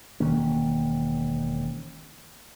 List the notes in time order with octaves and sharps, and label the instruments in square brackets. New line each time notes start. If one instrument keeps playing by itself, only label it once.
[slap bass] E1 D#3 A#3 C#4